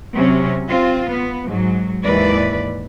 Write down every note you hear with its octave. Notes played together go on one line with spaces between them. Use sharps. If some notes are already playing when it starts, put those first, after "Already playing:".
C3 F#3 C#4
C4 F4
B3
G#2 F#3
D#2 G#2 E3 B4 D5